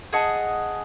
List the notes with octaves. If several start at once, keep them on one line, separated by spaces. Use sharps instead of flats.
G#4 D#5 F#5 A5